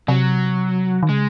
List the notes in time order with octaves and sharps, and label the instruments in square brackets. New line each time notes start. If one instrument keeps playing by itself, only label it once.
[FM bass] C3 [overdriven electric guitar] F#3
[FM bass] D#3
[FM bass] C#3 [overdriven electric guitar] G#3